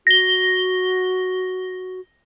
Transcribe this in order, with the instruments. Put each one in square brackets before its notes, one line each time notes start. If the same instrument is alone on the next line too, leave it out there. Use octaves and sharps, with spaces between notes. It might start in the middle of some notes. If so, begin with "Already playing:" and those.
[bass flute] F#4 [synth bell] A#6 G7